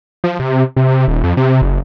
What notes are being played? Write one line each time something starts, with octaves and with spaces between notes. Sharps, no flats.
F3
C3
C3
C3
D#1
F2
C3
F#1